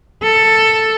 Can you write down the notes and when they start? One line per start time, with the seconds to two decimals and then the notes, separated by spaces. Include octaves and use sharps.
0.23 A4